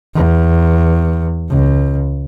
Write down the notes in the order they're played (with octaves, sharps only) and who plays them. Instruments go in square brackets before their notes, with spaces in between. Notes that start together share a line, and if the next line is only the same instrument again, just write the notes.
[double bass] E2
C#2